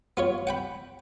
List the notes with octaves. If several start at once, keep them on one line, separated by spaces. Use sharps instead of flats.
B3 F4 C#5
F#5 G5 B5